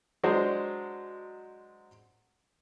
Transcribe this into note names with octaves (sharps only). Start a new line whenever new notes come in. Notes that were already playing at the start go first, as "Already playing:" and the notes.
F#3 G#3 D4 F#4 C5